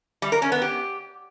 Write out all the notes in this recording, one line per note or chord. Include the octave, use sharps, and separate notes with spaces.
G3
A#4
C#4
B3
G4